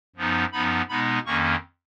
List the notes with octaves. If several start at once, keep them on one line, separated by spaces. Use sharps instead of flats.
F#2 F3 B3 D#4
F#2 F3 B3 D#4 B5
B2 G#3 B3 D#4 B5
F2 D#3 A#3 C#4 C#6